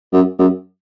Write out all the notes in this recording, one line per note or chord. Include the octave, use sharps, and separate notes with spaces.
F#2
F#2